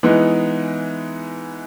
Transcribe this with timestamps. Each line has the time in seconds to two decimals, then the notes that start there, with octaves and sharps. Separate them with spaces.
0.03 E3 G#3 B3 D#4